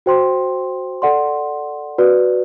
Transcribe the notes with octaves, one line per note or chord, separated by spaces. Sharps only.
F#4 C5 G5 C6
A4 D5 F#5 C6
F#4 B4 D5